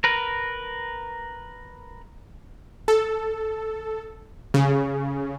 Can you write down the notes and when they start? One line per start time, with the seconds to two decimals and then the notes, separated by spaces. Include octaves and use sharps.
0.04 A#4 B4
2.88 A4
4.54 C#3